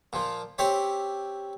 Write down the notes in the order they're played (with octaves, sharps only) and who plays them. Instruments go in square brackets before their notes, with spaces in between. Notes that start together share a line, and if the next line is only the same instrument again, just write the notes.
[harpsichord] A#2 F3
C4 G4 C#5 E5